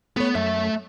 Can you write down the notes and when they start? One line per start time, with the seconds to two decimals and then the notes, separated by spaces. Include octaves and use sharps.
0.17 A3 B3 C#5
0.35 F#2 A3 E5